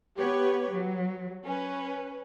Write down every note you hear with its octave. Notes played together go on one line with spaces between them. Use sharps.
B3 G4 B4 C#5
F#3
C#4 B4